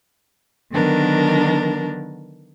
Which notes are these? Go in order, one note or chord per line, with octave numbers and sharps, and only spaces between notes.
D3 D#3 F#3 B3 D4 A#4